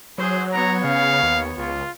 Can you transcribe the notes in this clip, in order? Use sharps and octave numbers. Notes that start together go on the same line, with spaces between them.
F#3 G#4 C5
B3 C#5 A#5
C#3 F5
D#2
C#2 F4